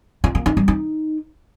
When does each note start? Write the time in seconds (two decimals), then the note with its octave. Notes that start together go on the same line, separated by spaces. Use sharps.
0.24 F4
0.35 A#3
0.46 D#4
0.57 G3
0.68 D#4